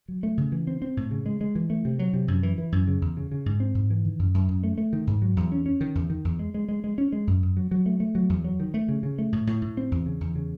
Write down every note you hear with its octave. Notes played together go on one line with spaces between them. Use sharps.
F#3
A3
C#3
E3
C4
C4
A2
C#3
G#3
G#3
E3
A3
C3
F#3
C3
F#2
E3
E3
F#2
C#3
E2
C#3
C#3
G#2
C4
G#2
E3
D#3
F#2
F#2
F#2
A3
A3
D#3
G#2
F#3
E2
C#4
C#4
D#3
E2
D#3
E2
G#3
G#3
G#3
G#3
C#4
G#3
F#2
F#2
F#3
F#3
A3
A3
F#3
E2
F#3
D#3
A3
C#3
C#3
A3
A2
A2
A2
C4
E2
C#3
E2
C#3